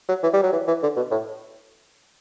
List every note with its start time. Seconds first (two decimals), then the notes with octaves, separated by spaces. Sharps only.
0.09 F#3
0.23 E3
0.33 G3
0.43 F#3
0.53 E3
0.68 E3
0.83 D3
0.97 B2
1.11 A2